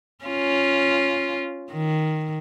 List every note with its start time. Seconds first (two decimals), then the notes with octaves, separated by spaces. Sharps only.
0.25 C#4 F4
1.72 D#3